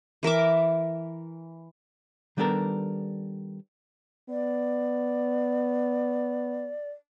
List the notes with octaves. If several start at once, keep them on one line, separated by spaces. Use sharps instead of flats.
E3 A#4 E5 D6
D#3 G3 B3 D4 A4 A#4
B3 D5